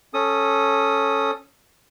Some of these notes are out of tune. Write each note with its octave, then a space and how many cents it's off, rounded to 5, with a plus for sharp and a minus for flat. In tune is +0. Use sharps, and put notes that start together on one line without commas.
C#4 -5 A4 +0 D#6 +0